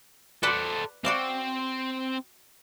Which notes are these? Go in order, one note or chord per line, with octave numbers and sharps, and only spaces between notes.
A4 B4 C5 D5 F#5
C4 F#4 D5 F5